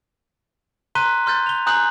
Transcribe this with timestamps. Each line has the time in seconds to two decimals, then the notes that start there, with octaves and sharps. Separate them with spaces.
0.95 A#5 C6 F#6 B6 D#7 G7
1.26 C6 F6 G6 A6
1.46 F7 G7
1.66 G#5 A#5 D#6 F#6 G6 F#7